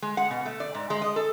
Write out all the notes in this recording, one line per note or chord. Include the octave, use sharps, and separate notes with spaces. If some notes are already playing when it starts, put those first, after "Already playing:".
G#3
F#5
B2
A3
D5
G#2
G#3
D#5
A4